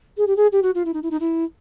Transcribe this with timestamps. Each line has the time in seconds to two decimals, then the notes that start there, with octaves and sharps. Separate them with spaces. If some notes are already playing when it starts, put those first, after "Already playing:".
0.17 G#4
0.27 G4
0.36 G#4
0.52 G4
0.63 F#4
0.75 F4
0.85 E4
0.94 D#4
1.03 E4
1.11 D#4
1.20 E4